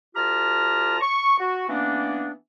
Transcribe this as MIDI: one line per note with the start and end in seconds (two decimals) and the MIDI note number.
0.15 0.96 38
0.15 0.96 65
0.15 0.96 67
0.15 0.96 81
0.15 0.96 82
0.15 0.96 89
1.01 1.35 85
1.38 1.65 66
1.69 2.31 52
1.69 2.31 58
1.69 2.31 59
1.69 2.31 61
1.69 2.31 62